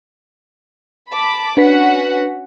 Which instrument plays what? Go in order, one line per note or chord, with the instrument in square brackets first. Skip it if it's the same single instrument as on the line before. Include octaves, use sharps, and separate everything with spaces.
[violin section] A5 B5 D6
[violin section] C#4 F#4 F#5 [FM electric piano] D4 B4 B6